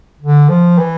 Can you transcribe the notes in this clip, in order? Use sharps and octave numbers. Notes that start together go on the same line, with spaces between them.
D3
F3
E3